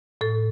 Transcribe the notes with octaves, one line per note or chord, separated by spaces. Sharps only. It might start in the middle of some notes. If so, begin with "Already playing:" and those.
A2 A4